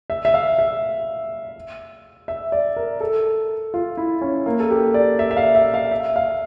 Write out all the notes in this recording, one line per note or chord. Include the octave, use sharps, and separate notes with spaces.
E5
E5
F5
E5
E5
D5
A#4
A4
F4
E4
C#4
A#3
A4
G4
D5
E5
E5
F5
E5
F5
E5
F5